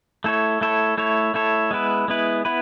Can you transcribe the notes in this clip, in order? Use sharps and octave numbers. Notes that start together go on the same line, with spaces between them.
A3 E4 A4 C#5
A3 E4 A4 C#5
A3 E4 A4 C#5
A3 E4 A4 C#5
G#3 B3 E4 B4
G#3 B3 E4 B4
B3 E4 B4